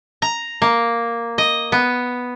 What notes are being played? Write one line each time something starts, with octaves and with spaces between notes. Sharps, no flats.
A#5
A#3
D#5
B3